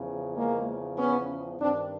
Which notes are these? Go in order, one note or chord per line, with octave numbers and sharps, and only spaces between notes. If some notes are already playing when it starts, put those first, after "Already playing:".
Already playing: E2 C#3 F3
G#3 A#3
B3 C#4
G2 D#3 C4 D4